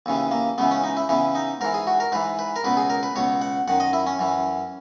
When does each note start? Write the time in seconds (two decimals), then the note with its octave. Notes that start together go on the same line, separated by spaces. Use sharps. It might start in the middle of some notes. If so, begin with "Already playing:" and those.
0.06 D#2 C#3 E3
0.31 A#3
0.58 C#2 C#3 E3 B3
0.71 C#4
0.84 D#4
0.97 E4
1.09 E2 C#3 E3 E4
1.35 D#4
1.61 G#2 E3 A#4
1.74 G#4
1.87 F#4
2.00 A#4
2.12 G#2 E3 B4
2.39 B4
2.56 A#4
2.64 C#2 B2 B4
2.77 G#4
2.90 A#4
3.03 B4
3.16 C#2 B2 C#5
3.42 F#5
3.68 F#2 D#3 F#5
3.80 D#5
3.93 E4
4.07 C#4
4.19 F#2 E3